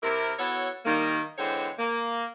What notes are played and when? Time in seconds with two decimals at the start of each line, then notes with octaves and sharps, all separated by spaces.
0.03 C3 E4 A#4
0.39 B3 E4 F#4 A4 C#5
0.86 D#3 G3 A#3
1.38 D3 E3 G#3 C4 C5 C#5
1.79 A#3